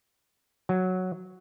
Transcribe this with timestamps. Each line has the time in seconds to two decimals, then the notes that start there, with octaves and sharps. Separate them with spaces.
0.69 F#3